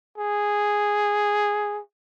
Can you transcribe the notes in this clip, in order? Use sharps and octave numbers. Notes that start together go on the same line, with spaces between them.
G#4